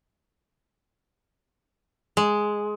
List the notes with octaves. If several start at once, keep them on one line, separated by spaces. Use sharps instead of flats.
G#3